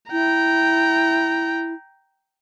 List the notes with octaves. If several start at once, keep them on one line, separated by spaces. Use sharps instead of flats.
E4 G5 A#5